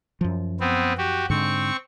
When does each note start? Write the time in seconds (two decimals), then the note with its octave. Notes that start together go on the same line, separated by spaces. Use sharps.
0.21 F#2 F3
0.60 B3 C4
0.98 F#4 G4
1.30 G#2 D3 C4 C#6